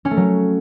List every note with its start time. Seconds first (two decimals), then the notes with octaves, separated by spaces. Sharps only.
0.05 C#4
0.11 A3
0.17 F#3